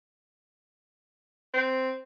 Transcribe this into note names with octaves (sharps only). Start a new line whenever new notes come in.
C4